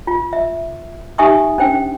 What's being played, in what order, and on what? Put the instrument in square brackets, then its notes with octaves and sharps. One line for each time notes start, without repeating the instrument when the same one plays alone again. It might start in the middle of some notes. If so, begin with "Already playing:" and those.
[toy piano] F4
E5
D#4 G4 E5 G#5 C#6 D#6
C#4 D4 C5 G5